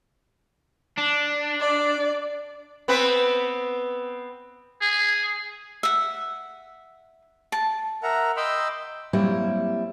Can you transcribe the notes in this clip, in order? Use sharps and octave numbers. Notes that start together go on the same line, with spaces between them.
D4
D5
B3 C4 B4
G#4
E5 F#5
A5
A#4 E5 F#5 A#5
D#5 G5 B5 C6 D6 E6
F#3 G3 A#3 C4 E4